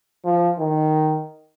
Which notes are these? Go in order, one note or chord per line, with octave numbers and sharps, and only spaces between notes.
F3
D#3